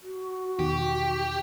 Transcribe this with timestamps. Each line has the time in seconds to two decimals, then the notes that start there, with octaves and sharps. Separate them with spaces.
0.02 F#4
0.59 E2 B2 D#3 G4